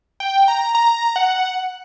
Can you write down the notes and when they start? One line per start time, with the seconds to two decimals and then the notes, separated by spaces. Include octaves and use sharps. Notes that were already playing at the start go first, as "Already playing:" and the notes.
0.20 G5
0.48 A#5
0.75 A#5
1.16 F#5